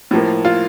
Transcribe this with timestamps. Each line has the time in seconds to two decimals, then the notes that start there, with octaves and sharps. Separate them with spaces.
0.11 A2 F3 A#3
0.45 F4